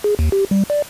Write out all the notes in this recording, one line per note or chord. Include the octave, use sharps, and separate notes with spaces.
G#4
D#2
G4
G3
D5